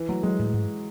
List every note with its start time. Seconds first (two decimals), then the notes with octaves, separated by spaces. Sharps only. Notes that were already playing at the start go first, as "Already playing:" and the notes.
Already playing: E3
0.09 F#3 A3
0.23 F#3 G#3
0.39 A2
0.53 G#2